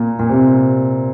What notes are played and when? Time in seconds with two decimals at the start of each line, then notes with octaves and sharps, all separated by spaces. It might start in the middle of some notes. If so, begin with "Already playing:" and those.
Already playing: A#2
0.19 A#2
0.30 C3